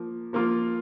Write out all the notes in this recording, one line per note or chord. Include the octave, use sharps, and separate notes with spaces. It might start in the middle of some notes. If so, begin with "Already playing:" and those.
Already playing: F3 A#3
F3 A#3 F4